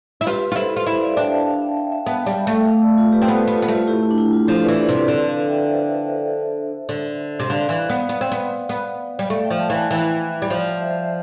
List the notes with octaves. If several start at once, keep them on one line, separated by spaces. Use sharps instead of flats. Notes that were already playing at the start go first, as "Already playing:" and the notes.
E4
F4 G4 B4
F4
E4 A4 C5
F4
E4 C5 E5
D5 F5
D4 E5 G5
D5 F5
F5 A5
E5 G5
E5 G5
E5 G5
B3 F5 A5
G3
E5 G5
A3
F5 A5
D5 F5
F4 A4
G4 B4
C4
B3 A4 C5
B3 G4 B4
B3 F4 A4
A3 F4 A4
E4 G4
E4
D4
E4
F4
F3 A4 C5
B4 D5
E3
B4 D5
C3 B4 D5
D3 B4 D5
D5 F5
E5 G5
C5 E5
C5 E5
D3
C3
D3 D5 F5
E3
B3
B3
C4
B3
B3
G3
A3 D5 F5
E5 G5
F3
F5 A5
E3
F5 A5
E3 E5 G5
G3
F3 D5 F5
C5 E5